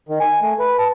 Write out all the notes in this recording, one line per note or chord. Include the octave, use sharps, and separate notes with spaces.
D#3
G#5
A3
B4
A5